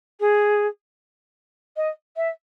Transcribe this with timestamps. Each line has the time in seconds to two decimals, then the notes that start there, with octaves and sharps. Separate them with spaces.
0.20 G#4
1.77 D#5
2.16 E5